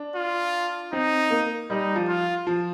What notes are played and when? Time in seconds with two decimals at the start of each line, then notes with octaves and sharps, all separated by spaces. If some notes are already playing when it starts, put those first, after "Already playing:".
Already playing: D4
0.16 F4
0.93 C4 D#4
1.31 A#3
1.70 G3 D#4
1.96 F3
2.08 F4
2.47 F3